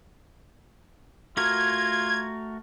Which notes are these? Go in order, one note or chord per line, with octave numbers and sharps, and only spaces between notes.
A3 F4 F#4 A#4 G#6